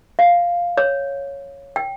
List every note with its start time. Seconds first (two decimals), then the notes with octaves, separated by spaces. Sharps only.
0.19 F5
0.77 C#5
1.76 G5